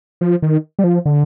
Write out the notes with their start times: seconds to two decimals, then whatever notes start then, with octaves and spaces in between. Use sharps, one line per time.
0.21 F3
0.42 D#3
0.79 G3
0.84 F3
1.06 D3